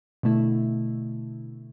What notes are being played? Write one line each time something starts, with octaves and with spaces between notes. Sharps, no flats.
B2 D3 A3 E4